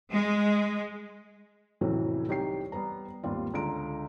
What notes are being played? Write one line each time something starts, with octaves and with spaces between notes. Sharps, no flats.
G#3
F2 A2 C3 E3 F#3 C#4
C2 D#4 G4 C#5 G5 C7
G3 B3 B4 A#5
G#1 D#2 G3 F4
C#2 D3 F4 A#5 D7